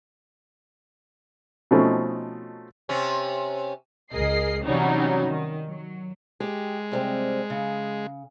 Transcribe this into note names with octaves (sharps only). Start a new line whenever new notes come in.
B2 F3 A3 C4 C#4 D#4
C3 C#4
C#2 G#4 A#4 D#5 C7
C3 E3 F#3 G3 C#4 D#4
D#3
F#3
G#3 G4
C3 G3 C4
C#3